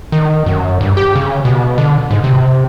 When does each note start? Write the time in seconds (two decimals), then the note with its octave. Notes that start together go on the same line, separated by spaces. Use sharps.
0.12 D#3
0.46 F#2
0.81 G2
0.97 G4
1.16 C#3
1.45 B2
1.78 D3
2.11 G#2
2.24 C3